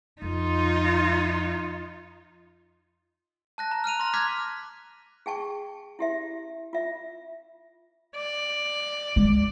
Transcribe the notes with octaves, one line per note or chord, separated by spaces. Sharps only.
F2 D#4 F4
A5 F#6 A#6
A#5
F6 F#6 D#7 F7
C6 A#6
D6 F6 F#6 G#6 B6
G#4 G5 A5 C#6
E4 G4 E5
F4 E5
D5
G#3